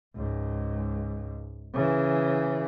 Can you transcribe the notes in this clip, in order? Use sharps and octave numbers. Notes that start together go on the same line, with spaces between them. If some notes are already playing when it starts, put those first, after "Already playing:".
C#2 G#2
C#3 E3